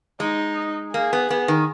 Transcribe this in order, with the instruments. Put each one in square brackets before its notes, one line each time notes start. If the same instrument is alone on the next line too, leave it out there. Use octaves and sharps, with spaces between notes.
[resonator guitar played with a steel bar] G#3 [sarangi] D#4
[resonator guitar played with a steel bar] A#3 [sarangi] G#4
[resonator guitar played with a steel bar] B3
B3
D#3